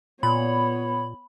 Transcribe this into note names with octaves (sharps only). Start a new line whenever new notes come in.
A#2 B3 C#5 B5